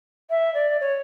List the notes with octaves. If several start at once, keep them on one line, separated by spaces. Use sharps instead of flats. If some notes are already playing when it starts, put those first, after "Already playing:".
E5
D5
C#5